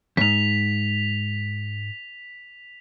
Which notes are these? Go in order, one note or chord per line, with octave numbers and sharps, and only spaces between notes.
E2 G#2 B6 F7